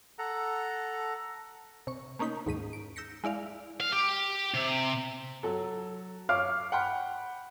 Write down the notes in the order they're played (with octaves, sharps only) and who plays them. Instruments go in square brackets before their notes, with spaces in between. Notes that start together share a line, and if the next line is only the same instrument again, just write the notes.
[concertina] A4 F#5 A#5
[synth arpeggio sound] C3 C#6
A3 A#3 C#4 D#4 G6 B6
D#2 G#2 B6 D#7
D7
E6 G6 A#6 B6 C#7
G#3 E4 D5 F5
[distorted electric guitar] F5
G4
C3
[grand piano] F#3 A4
C#5 F5 D6 F6
F#5 G5 B5